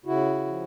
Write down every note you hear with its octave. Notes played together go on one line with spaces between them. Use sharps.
C#3 E4 F#4
F3